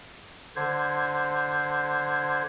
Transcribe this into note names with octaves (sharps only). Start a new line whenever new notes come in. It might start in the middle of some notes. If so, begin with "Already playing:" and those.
D3 C5 G#6